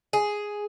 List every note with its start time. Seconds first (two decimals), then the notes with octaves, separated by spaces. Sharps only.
0.13 G#4